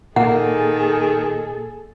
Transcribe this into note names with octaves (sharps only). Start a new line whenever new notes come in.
A#2 D#3 A#3 G#4 A4 F#5